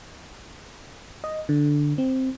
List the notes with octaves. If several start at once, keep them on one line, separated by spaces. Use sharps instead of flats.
D#5
D3
C4